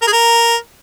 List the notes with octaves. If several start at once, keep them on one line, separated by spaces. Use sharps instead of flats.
A#4
G#4
A#4